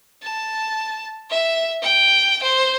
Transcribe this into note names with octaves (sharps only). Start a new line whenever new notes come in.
A5
E5
G5
C5